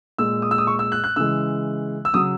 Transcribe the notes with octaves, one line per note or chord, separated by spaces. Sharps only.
A#2 G#3 E6
D#6
E6
D#6
C#6
E6
F#6
F#6
C#3 E3 G#3 E6
E6
C#3 F#3 D#6